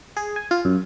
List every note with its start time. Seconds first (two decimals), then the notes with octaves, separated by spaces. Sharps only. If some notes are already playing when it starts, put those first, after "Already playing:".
0.17 G#4
0.36 G#5
0.51 F4
0.65 F#2